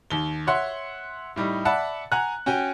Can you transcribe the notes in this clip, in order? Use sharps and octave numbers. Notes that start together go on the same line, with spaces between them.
D#2 G7
C#5 E5 F#5 C6
A2 G3 D#4
D5 E5 F#5 A5 B5
F#5 G#5 A#5 F#6
C#4 F#4 G5 G#5